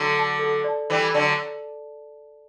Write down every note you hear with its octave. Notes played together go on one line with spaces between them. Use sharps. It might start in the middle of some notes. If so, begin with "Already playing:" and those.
Already playing: D3 F#3 A4
D5 A5
A4
D5 A5
E3 G3 A4
D3 F#3 D5 A5